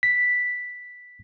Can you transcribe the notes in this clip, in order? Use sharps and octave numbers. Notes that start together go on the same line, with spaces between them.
B6